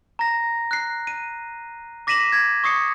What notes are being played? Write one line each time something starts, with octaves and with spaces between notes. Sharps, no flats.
A#5 A#6
F#6 C7
D#7
D6 A#6 B6 D#7 E7 F#7
G#6
C#6 D#6 C7 C#7